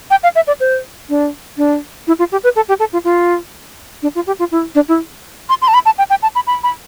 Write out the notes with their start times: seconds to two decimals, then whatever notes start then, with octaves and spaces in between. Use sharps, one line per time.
0.10 G5
0.23 F5
0.35 E5
0.47 D5
0.60 C5
1.09 D4
1.57 D4
2.07 E4
2.19 F4
2.32 G4
2.44 B4
2.56 A4
2.68 G4
2.79 A4
2.93 F4
3.04 F4
4.02 D4
4.15 F4
4.27 G4
4.39 F4
4.51 E4
4.75 D4
4.88 E4
5.49 C6
5.62 C6
5.68 A5
5.74 B5
5.85 A5
5.98 G5
6.10 G5
6.22 A5
6.35 B5
6.47 B5
6.63 B5